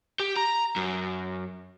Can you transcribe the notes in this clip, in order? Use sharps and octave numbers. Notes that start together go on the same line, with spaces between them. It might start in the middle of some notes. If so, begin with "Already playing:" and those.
G4
A#5
F#2